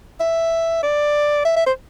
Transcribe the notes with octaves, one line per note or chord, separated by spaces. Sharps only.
E5
D5
E5
E5
C5